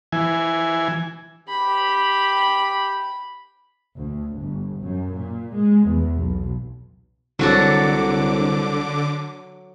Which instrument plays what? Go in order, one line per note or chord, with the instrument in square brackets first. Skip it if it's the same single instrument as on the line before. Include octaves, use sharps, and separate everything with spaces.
[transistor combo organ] E3 G#5
[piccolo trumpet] G4 [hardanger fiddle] B5
[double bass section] D2
G1
F#2
A#2
G#3
E2
B1
[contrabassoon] C2 [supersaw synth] D3 D6 [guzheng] F#3 F#4 A4